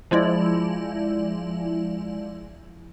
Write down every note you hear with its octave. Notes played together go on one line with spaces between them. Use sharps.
F3 G#3 E4 D5